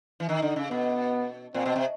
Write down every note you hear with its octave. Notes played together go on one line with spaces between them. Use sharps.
E3
D#3 D#4
D3
C#3
B2 B3
A#2 C4
B2
C3